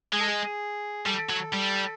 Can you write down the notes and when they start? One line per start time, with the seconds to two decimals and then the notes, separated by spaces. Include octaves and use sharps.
0.13 G#3 G#4
0.20 A4
0.27 G#4
1.06 G3 A4
1.29 F#3
1.52 G3